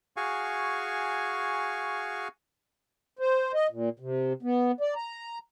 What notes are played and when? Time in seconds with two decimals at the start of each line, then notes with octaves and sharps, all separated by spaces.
0.17 F#4 G#4 F5 G#5 C#6
3.19 C5
3.54 D#5
3.70 A#2
4.00 C3
4.43 B3
4.81 D5
4.95 A#5